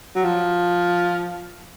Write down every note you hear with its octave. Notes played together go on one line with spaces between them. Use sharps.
F#3
F3